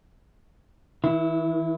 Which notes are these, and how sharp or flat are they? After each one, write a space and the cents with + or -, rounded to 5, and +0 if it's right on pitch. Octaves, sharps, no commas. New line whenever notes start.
E3 -45 E4 +5